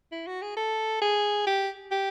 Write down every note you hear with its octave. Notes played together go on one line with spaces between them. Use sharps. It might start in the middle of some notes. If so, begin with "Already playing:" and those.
E4
F#4
G#4
A4
G#4
G4
G4